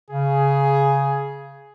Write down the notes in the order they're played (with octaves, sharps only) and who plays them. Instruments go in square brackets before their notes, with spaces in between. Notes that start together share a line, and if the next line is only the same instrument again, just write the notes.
[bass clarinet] C#3 [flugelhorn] G#4